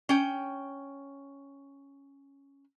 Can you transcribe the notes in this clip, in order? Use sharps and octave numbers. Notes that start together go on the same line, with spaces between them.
C#4 G5